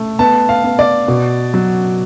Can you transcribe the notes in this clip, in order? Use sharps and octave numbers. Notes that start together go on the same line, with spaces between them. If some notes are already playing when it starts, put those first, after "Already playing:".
Already playing: A3
B3 A5
F5
B3
D5
B2
F#3